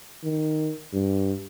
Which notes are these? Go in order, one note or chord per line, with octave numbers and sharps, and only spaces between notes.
D#3
G2